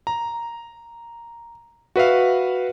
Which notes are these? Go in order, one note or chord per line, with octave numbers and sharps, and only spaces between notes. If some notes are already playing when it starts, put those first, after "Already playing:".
A#5
F#4 B4 E5 F5